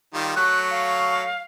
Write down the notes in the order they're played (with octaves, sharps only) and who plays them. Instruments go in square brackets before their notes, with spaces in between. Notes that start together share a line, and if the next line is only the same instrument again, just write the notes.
[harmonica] D#3 G3 F4
[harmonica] F#3 A3 C#5 [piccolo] F#6
[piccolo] F5